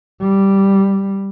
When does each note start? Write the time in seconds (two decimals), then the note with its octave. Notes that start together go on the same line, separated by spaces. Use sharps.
0.21 G3